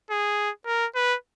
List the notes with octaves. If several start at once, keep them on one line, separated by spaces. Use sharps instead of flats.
G#4
A#4
B4